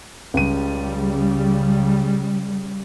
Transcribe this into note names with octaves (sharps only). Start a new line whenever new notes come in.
C#2 C#3 G3 D#7